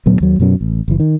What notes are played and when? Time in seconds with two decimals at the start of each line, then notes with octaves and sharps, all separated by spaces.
0.06 D2 A#2 F#3 B3
0.20 D#2 F#3
0.40 F#2 B2 F#3 C#4
0.61 A1
0.88 F#1 E3
1.00 D#3